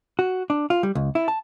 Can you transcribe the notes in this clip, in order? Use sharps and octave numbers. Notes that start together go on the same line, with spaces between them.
F#4
D4
F4
G3
C#2
E4
A5